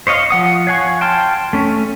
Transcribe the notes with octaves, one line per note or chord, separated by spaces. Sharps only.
C5 C#5 D#5 F5
F3 F#5 D#6
C#5 F5 F#5 G#5 C#6
G5 A5 C6 F6
A3 C#4